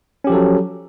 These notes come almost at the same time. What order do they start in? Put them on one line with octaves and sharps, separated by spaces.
C#4 G4 F3 A4 F#3